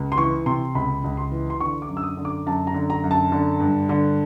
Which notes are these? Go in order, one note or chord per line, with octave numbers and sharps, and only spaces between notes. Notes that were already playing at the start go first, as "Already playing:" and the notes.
Already playing: C#2
C6
E3 C#6
C3 C6
C#2 B5
C#2
C6
E3
C6
D3 C#6
D6
F#2
E6
D#6
D3
D6
F#2 A5
A#5
D3
A#5
F#2
A5
D3
G2
D3